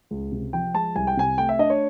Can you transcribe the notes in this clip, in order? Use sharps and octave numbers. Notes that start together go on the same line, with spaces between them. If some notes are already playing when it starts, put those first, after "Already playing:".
C#2
C3
F3 G5
G#3 A5
C2 G#5
G5
C3 G#5
A3 G5
E5
D4 D#5
C#5